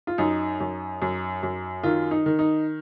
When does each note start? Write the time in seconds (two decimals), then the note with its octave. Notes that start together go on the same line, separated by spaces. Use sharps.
0.07 F4
0.18 F#2 D#4
0.60 F#2
1.02 F#2
1.43 F#2
1.83 D#3 F4
2.11 D#4
2.26 D#3
2.39 D#4